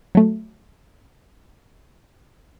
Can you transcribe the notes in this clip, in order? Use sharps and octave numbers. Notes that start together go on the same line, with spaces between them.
F#3 A3